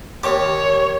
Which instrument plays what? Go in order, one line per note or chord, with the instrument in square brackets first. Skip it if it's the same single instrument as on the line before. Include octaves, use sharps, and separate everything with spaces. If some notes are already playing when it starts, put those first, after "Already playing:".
[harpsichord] D#2 G4 [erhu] C#5